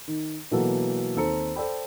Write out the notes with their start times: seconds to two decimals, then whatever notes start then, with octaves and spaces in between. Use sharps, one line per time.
0.08 D#3
0.51 B2 E3 F#3 A#3 F#4 A4
1.16 D#2 C4 A4 C5 A#5 C#7
1.56 A4 C5 D5 G5 B5